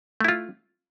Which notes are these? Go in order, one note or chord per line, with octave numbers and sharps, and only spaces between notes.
A3 E4 F4